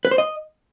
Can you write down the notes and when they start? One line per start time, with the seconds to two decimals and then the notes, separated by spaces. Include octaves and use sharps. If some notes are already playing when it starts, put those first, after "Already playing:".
0.05 B4
0.11 C5
0.18 D#5